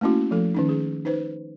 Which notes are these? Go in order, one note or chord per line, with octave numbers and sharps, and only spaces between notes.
A3 A#3 C#4 E4 F#4
F3 A3 A4
D#3 C#4 D#4
G#4
D#4 B4 C5